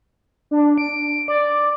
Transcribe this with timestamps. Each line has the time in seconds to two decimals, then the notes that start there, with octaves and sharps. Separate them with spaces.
0.51 D4
0.78 D7
1.28 D5